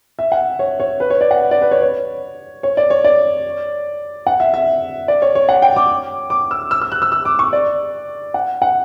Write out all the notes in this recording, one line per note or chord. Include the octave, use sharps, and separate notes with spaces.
E5
F#5
C#5
C#5
B4
C#5
D5
F#5
D5
B4
C#5
C#5
C#5
D5
C#5
D5
F#5
E5
E5
D5
C#5
C#5
F#5
G5
D6
D6
E6
E6
E6
F#6
E6
E6
D6
C#6
D5
F#5
F#5